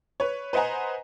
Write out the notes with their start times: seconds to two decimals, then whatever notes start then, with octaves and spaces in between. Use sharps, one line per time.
0.20 B4 C#5
0.53 B4 C5 D#5 F#5 G#5 A#5